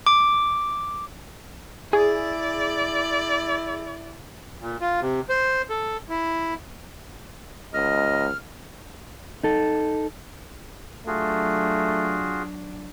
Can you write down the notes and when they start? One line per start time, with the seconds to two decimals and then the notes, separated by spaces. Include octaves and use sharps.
0.07 D6
1.93 E4 G#4 D5
4.61 A#2
4.81 F4
5.01 C3
5.29 C5
5.70 A4
6.09 E4
7.74 C#2 D#5 F6
9.43 D#4 A4
11.07 F#3 A3 D4 F4 F#4 G#4